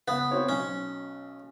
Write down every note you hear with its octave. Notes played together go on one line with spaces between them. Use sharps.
C#3 B3
C4 F#4 C#5
B1 C#4